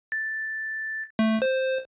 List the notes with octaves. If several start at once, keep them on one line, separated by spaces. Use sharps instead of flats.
A6
A3
C5